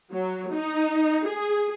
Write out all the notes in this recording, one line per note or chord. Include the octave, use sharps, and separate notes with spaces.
F#3
D#4
G#4